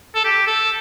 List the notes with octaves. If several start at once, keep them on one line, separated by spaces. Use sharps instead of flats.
A4
G4
A4